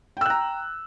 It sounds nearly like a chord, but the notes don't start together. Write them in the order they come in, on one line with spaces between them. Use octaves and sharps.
G5 E6 F#6 A#5